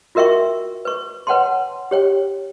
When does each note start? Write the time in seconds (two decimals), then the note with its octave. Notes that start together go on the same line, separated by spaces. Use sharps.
0.15 F4 F#4 A#4 E5 G5 C#6
0.85 B4 C#6
1.27 B4 C#5 F#5 G5 A5 C6
1.91 G4 C#5 G5